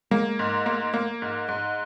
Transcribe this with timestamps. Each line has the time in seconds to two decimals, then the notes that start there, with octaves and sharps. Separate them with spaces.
0.11 G#3 A#3
0.39 G#2
0.66 A#3
0.94 A#3
1.22 G#2
1.49 G#2